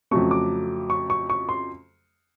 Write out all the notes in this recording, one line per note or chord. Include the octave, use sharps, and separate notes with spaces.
F2 C#3 F#3 A3 C#6
D6
C#6
C#6
C#6
C6